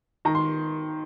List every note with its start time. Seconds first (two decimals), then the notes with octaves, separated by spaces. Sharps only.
0.25 D#3 A#5
0.35 C6